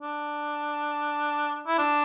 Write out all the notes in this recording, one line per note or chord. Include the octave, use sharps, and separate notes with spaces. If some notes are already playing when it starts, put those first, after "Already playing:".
D4
E4
D4